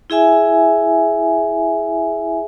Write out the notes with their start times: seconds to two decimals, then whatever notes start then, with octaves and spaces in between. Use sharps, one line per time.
0.10 E4 G#4 E5 G#5